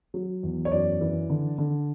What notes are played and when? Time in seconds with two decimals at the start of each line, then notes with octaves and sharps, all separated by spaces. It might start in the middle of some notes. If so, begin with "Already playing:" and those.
0.14 F#3
0.43 E2
0.65 C#5
0.72 F#2 D5
1.01 E3
1.30 D3
1.58 D3